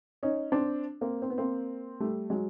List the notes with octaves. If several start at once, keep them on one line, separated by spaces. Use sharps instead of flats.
C#4 D#4
C4 D4
A#3 C4
C4
B3
A#3 C4
G3 A3
F#3 G#3